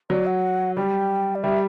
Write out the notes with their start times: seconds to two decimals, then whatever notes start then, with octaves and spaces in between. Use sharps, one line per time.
0.10 F#3 D5
0.26 F#5
0.77 G3 G5
1.35 D5
1.43 G3 E5